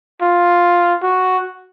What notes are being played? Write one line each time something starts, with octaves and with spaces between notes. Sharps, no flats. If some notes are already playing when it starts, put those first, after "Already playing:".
F4
F#4